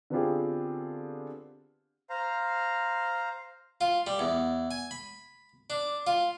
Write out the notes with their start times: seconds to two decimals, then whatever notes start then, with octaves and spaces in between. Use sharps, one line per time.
0.10 D3 B3 C4 F4 G4 G#4
2.10 C5 F5 A#5
3.81 F4
4.07 G3
4.19 E2
4.71 G#5
4.91 B5
5.70 D4
6.07 F4